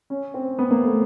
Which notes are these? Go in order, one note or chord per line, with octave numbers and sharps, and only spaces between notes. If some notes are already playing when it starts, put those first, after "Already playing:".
C#4
C4
B3
A#3
A3